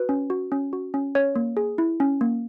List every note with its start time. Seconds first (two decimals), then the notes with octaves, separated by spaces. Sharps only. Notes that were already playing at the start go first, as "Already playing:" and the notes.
Already playing: F#4 B4
0.09 C#4
0.30 F#4
0.52 C#4
0.73 F#4
0.94 C#4
1.15 C#4 C#5
1.36 A#3
1.57 G#4
1.78 E4
2.00 C#4
2.21 A#3